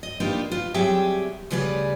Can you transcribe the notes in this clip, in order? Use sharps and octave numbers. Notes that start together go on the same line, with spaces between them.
D#5
A#3 D4 D#4 F4 G4 B4
F4 B4
F#3 G3 C4 G4 G#4 E5
D2 C#3 G3 G#4 B4 D5